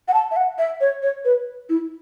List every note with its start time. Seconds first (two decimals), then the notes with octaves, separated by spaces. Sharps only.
0.08 F#5
0.14 A5
0.31 E5
0.36 F#5
0.58 E5
0.81 C#5
1.02 C#5
1.25 B4
1.69 E4